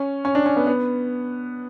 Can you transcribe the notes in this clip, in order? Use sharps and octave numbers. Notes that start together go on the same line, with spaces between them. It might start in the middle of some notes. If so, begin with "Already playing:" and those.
Already playing: C#4
C#4
D4
C#4
B3
B3